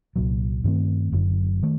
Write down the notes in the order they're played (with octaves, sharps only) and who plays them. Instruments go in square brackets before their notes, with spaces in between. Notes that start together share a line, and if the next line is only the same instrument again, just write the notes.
[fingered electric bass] C2 A#2 F#3
G2 D#3 A3 C4
F#1 F#2 D3 F#3
D#3 A3